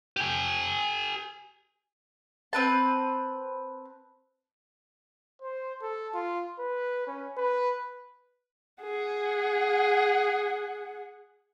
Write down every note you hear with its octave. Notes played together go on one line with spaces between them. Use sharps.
G4 G#5
C4 B4 A5
C5
A4
F4
B4
C#4
B4
G#4 F#5